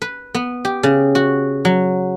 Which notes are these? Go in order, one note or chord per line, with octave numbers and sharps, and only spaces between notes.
B4
B3
G4
C#3
F#4
F#3